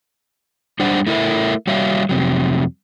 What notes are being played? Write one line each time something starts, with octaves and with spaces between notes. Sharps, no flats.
G3 D4 C5 F#5
A3 E4 A#4 E5
G3 F#4 C#5 E5 F5
F2 C3 F#3